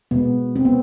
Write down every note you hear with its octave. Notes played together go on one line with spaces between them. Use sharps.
B2 G#3 B3
C4
B3